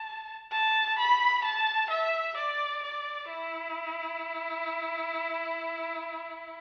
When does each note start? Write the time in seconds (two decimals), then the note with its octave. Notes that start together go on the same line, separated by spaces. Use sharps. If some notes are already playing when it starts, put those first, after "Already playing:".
Already playing: A5
0.52 A5
0.98 B5
1.44 A5
1.90 E5
2.37 D5
2.83 D5
3.29 E4